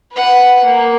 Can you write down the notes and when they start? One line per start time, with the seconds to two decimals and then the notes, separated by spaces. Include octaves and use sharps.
0.12 B4 F#5
0.64 A#3